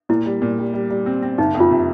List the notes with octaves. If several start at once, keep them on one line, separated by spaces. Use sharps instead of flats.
A#2 E4
G3
A#2
G3
G3
G3
C4
C4
F#1 D#4
F2
F4
C3